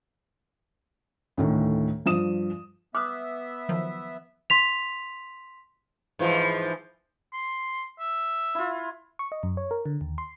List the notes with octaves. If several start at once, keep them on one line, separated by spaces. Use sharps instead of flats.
D2 A2 D#3
G2 F3 D#6 E7
B3 E5 D6 D#6 F6 F#6
D#3 F3 F#3
C6 B6 F7
G#2 E3 F3
C6
E5
E4 F4
C#6
D#5
F#2
C#5
A#4
D3
D#2
C6